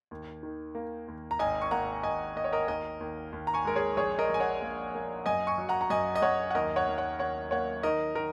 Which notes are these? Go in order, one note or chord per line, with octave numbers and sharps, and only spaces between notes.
D#2
D#3
A#3
D#2
A#5
G#1 D#5 G#5
C#6
A#3 F#5 A#5
G#1 D#5 G#5
A#3 D#5
C#5
A#4 D#5
D#2 A#4 D#5
D#2
D#2
A#5
G#5 C#6
G#3 A#4
G#4 C#5
A#1 G#4 C#5
A#4 D#5
A#1 G#5
C#5 F#5
A#3
A#3
F#2 D#5 G#5
G#5 C#6
F#3
F#5 A#5
A#5
F#2 D#5 G#5
D#5
F#2 C#5 F#5
F#5
D#2 A#4 D#5
C#5 F#5
D#2
C#5 F#5
D#2 C#5 F#5
A#3 C#5 F#5
D#3 A#4 D#5
D#3 A#4